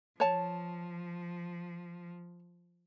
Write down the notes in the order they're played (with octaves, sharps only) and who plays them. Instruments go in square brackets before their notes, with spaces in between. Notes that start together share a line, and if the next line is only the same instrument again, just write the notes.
[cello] F3 [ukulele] C#5 A5